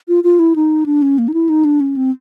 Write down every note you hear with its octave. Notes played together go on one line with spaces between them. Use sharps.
F4
F4
E4
D#4
D4
C#4
A#3
D#4
E4
D#4
D4
C#4
C4